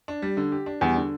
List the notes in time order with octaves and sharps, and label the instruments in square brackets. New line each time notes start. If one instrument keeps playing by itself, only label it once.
[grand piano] D4
G3
D3
G4
D4
[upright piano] E2 [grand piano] G3
[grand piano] D3